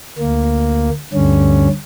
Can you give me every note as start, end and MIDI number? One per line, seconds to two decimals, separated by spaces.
0.18 0.90 38
0.18 0.90 58
1.13 1.68 38
1.13 1.68 43
1.13 1.68 50
1.13 1.68 61